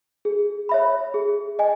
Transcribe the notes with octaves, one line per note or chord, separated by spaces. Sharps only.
G#4
C#5 E5 B5
G#4
D#5 G#5